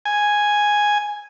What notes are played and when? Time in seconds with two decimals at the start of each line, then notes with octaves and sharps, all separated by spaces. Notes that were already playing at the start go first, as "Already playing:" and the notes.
0.06 G#5